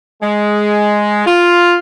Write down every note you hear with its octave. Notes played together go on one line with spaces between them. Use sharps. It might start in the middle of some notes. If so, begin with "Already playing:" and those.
G#3
F4